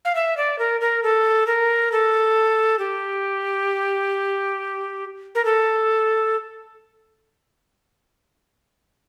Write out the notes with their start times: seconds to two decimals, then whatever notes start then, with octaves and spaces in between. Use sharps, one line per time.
0.05 F5
0.15 E5
0.37 D5
0.59 A#4
0.81 A#4
1.03 A4
1.47 A#4
1.92 A4
2.79 G4
5.35 A#4
5.45 A4